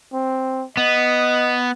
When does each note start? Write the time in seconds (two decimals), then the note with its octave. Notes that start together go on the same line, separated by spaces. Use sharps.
0.13 C4
0.77 B3 D#5